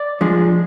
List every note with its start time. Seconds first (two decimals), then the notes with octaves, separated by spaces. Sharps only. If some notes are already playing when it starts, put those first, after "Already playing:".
Already playing: D5
0.21 F3 G#3 D4